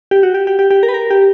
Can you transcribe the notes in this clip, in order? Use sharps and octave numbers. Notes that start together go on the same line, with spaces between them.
G4
F#4
G4
G4
G4
G4
A#4
B4
A#4
G4